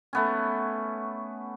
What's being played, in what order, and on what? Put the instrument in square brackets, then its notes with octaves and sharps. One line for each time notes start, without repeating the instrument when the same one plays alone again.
[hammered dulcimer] A3 B3 C#4